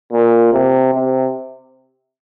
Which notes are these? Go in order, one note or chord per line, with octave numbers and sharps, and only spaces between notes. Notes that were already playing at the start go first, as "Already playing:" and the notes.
A#2
C3
C3